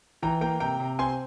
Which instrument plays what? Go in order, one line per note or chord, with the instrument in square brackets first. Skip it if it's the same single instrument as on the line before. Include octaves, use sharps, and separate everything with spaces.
[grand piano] E3 G5 A#5
A#3 G5 A#5
C3 G5 A#5
C3
C4 G#5 C6